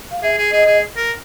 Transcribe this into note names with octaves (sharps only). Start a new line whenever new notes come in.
F5
G#4 E5
G#4
G#4 D#5
G#4
A#4